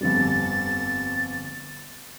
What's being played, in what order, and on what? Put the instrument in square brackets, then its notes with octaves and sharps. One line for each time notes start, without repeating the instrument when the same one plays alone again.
[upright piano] G1 F2 G3 [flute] A6